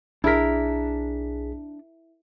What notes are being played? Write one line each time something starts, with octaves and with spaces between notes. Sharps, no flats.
B1 D4 E4 G#4 A#4 B6